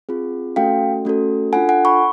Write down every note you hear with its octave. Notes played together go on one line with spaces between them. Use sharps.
C4 F4 G#4
A3 C#4 F#4 A4 F5 G5
A3 C#4 F#4 A4
D4 F4 A4 F#5 G#5
F#5 G#5
B5 C#6